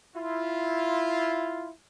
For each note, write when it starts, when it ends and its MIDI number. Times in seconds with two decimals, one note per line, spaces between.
0.16 1.70 64
0.16 1.70 65